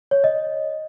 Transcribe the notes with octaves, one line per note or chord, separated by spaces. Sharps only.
C#5
D#5